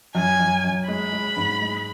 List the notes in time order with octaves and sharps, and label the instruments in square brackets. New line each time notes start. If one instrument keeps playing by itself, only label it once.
[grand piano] F#2 [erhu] G#5
[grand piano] F#2
F#2
[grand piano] G#3 [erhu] B5
[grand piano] G#3
G#2
G#3